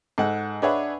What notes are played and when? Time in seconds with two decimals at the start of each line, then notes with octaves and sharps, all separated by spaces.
0.18 G#2 A4 F#5
0.62 D4 G#4 B4 C#5 E5 F#5